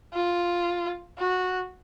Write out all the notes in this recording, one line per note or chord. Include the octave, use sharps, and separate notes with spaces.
F4
F#4